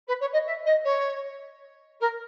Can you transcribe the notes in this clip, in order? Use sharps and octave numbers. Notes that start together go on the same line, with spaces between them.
B4
C#5
D#5
E5
D#5
C#5
A#4